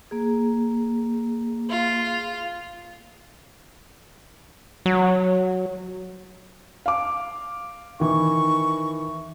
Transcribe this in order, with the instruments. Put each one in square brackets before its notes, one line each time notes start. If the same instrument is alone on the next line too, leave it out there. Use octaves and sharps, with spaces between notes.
[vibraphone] A#3 G#4
[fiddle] F4
[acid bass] F#3
[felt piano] F5 D6
[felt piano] D#3 E3 [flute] C#6